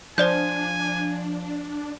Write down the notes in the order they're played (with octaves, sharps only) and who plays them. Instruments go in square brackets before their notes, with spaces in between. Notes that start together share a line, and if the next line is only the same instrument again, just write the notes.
[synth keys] F3 [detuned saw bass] D4 [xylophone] C5 D5 G6 [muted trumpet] G#5